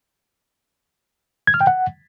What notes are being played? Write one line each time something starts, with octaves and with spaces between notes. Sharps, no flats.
G#6
F6
G5
F#5